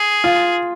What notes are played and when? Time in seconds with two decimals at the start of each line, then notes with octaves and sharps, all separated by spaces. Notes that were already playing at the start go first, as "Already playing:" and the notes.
Already playing: G#4
0.24 F4